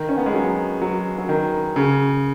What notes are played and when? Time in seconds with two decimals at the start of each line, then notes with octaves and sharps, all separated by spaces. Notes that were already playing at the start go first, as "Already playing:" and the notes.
Already playing: D#3
0.09 C#4
0.18 B3
0.26 G#3
0.34 F#3
0.82 F#3
1.18 F#3
1.29 D#3
1.76 C#3